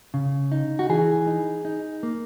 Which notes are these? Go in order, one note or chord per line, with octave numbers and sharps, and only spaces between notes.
C#3
D#4
F#4
E3 G#4
D#4
D#4
A#3